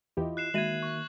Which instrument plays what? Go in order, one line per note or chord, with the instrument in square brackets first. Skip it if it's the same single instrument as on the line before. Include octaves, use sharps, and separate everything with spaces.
[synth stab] E2 E3 G4 [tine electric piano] E4 F4 D#5
[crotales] F#6 C7 E7
[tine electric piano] D#3 A#3 [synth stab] G#3 [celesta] F#4 E5 D#7 [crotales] G#6 F#7
[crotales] C#6